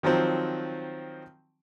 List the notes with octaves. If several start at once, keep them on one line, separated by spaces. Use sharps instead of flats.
D#3 F3 F#3 C4